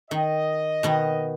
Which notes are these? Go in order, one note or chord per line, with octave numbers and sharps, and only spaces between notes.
D#3 D#5
B2 D#3 B3